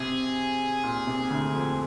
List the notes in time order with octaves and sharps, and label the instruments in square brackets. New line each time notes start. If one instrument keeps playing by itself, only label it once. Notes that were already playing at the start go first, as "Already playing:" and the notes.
Already playing: [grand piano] C3 [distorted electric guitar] G#4
[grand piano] A#2
C3
D2 D3
F2 F3